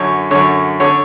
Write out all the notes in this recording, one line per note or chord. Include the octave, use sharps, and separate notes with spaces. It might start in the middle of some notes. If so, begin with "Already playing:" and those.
Already playing: F#2 D3 C#5
F#2 D3 C#5
D3 C#5